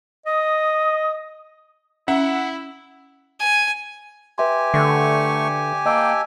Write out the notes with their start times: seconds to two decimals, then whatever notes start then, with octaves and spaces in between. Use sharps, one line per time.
0.26 D#5 D#6
2.08 C#4 E4 E5 F#5
3.40 G#5
4.38 G4 B4 E5 G#5 C6
4.74 D3 A3 C#6
5.86 A#3 D#5 G5 A5 E6